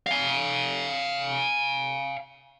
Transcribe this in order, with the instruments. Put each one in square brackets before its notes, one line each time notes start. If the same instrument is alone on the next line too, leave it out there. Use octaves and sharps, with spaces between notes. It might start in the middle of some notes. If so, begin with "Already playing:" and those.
[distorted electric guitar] F5 G#5